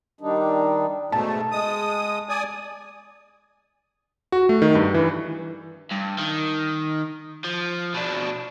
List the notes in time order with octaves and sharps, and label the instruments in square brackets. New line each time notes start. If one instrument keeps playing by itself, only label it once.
[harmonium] D#3 G3 D4 D#4
[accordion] G#2 B2 A3 [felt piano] A5
[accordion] G#3 D#6
D5 G#5 D#6
[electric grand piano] F#4
A3
D#3
G2
E3
[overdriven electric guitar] G2
D#3
F3
B2 D4